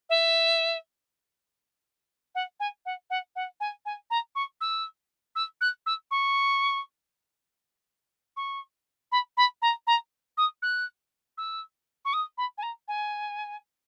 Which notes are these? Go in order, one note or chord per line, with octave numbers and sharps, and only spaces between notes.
E5
F#5
G#5
F#5
F#5
F#5
G#5
G#5
A#5
C#6
E6
E6
F#6
E6
C#6
C#6
B5
B5
A#5
A#5
D#6
F#6
E6
C#6
D#6
B5
G#5
A#5
G#5